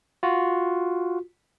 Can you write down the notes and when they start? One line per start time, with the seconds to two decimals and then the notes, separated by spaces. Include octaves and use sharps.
0.23 F4 F#4